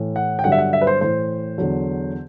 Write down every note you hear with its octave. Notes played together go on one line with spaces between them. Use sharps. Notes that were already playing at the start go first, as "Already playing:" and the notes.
Already playing: A2 E3
F#5
G5
G2 D3 F#3 F#5
E5
F#5
E5
B4
C5
A2 E3 C5
E2 D3 F#3